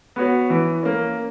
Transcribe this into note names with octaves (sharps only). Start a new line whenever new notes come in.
B3 F#4 C#5
E3
A#3 C#4